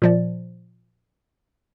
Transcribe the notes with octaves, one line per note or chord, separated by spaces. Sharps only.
A#2 F3 D5